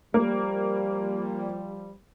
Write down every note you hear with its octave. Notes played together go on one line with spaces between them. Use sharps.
F3 G3 A#3